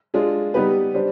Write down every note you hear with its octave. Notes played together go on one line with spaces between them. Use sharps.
G#3 D4 F4 G#4
G3 B3 D#4 G4 B4
G3 D4 G4 C5